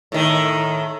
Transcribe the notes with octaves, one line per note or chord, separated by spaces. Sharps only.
A2 D#3